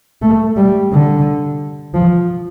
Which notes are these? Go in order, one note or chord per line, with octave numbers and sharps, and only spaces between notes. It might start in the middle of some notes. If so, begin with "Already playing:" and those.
A3
G3
D3
F3